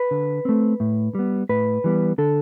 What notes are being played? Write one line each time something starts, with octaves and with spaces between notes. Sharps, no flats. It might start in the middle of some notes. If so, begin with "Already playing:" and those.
Already playing: B4
D3
A3 C4
A2
G3 B3
A2 B4
E3 G3 B3
D3 A4